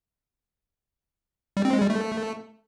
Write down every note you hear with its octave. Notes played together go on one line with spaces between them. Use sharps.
G3
C4
G#3
G3
A3